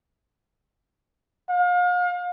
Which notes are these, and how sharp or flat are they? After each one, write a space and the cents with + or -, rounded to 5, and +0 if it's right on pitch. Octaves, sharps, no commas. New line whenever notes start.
F5 +35